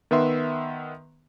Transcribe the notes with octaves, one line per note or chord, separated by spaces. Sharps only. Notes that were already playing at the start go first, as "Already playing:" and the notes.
D#3 B3 B4 E5 C6